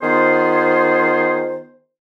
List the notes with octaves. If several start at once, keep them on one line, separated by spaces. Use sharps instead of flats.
D#3 B3 F4 G#4 C5